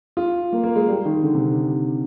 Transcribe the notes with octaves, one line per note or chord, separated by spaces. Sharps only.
F4
A#3
A#3
G#3
G3
D#3
D3
C3